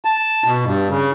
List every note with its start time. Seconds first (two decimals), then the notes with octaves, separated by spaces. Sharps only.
0.05 A5
0.45 B2
0.65 G2
0.91 C#3